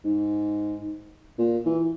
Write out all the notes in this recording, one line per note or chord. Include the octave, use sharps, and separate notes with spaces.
G#2
A#2
E3